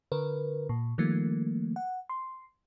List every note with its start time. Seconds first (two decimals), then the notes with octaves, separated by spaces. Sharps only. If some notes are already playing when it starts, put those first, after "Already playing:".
0.12 D3 A#4 B4
0.69 A#2
0.98 D#3 F3 G3 A3 A#3
1.76 F#5
2.09 C6